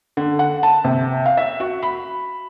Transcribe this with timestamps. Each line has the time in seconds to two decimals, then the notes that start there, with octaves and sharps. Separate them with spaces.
0.17 D3
0.39 F#5
0.63 A5
0.84 C3
1.26 F5
1.37 E5
1.60 F#4
1.82 B5